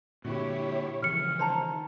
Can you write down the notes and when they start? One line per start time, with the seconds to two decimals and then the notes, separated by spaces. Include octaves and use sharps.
0.25 A#2 D3 E4 F#4 G4 C#5
1.03 C#3 E3 F3 F6 C#7
1.39 D#3 C5 A5 A#5